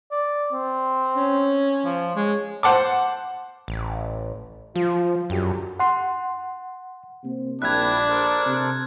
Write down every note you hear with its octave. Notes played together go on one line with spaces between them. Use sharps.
D5
C4
C#4
F3
G#3 C#5
C5 F#5 A5 D6
A1
F3 F4
F#2 D3 F#4 G4
F#5 C6
C3 A#3 C4
A#1 G3 D4 E4 E5 F#6 G#6
A4 A#4 C5
C3